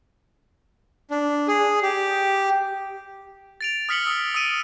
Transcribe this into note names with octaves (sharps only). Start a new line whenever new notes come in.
D4
G#4
G4
A6 D7 F7
D#6 F6 B6 C#7 F#7 G7
D#6 E6
D#6 E6 D7 D#7